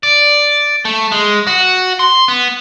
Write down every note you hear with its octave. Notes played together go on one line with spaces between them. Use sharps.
D5
A3
G#3
F#4
C6
B3